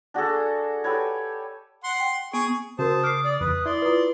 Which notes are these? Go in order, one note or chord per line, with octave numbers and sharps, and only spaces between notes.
D4 F#4 G#4 A4
G4 A4 B4 C#5
F#5 C6
G5
B3 G#4 C#6
C#3 F#4 A#4 C5 A5 D#6
D6 F6 C7
D5
F2 B4
E4 D5 C6
F4 B4